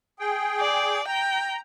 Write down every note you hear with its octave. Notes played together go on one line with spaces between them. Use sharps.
G#4 G5
D5
G5 A#5